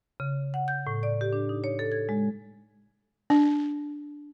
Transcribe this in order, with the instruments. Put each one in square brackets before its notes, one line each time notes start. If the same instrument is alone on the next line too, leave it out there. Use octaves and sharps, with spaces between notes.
[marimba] C#3
F#5
G6
A2
D5
G4
D4
D#4
C#5
A4
G#6
G#3
[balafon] D4